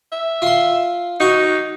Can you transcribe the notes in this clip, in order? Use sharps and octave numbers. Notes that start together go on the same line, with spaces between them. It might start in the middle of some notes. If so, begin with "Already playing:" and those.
E5
F4 C6
D#4 F#4 C#6